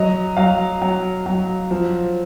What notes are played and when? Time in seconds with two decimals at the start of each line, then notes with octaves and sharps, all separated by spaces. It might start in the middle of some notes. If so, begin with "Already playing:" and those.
Already playing: F#3 D#5
0.37 F#3 F5
0.82 F#3
1.26 F#3
1.71 F3